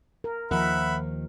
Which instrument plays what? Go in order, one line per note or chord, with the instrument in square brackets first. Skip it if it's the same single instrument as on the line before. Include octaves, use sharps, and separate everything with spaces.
[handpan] A#4
[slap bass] D#2 D#3 [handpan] F3 A#4 [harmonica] E5 F#5 B5